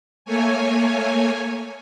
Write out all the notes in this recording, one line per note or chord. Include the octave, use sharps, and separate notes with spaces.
A3 A#3 C#5 G#5